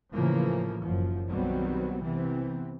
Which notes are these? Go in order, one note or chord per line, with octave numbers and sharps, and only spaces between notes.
A2 C#3 E3 F3 A#3
F#1 F#2 F3
B1 D#3 F#3 G3 B3 C4
C3 E3 B3 C4